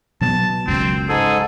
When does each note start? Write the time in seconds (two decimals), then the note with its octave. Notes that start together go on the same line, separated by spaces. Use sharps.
0.21 B2 F#3 B3 A5
0.67 F#1 C#2 F#2 C4
1.09 G#2 G#4 A4